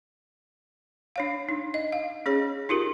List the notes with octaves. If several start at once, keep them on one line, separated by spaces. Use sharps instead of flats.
D4 C#5 F5
D#4
D#5
F5
C#4 G#4 C#5
D#4 F4 G4 A#4